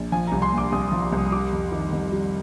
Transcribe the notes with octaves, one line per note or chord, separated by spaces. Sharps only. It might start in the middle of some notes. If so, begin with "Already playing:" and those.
Already playing: A#1
F3 G#5
C2 A#5
C6
A#2
D6
C2 D#6
F3 D#6
C6
C2 D#6
D#6
G3 D6
F2
D#3
F2
G3